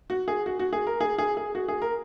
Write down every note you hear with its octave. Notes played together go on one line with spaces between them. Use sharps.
F#4
G#4
F#4
F#4
G#4
A#4
G#4
G#4
G#4
F#4
G#4
A#4